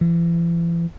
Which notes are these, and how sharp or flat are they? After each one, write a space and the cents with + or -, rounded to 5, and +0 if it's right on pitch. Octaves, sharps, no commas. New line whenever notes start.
E3 +40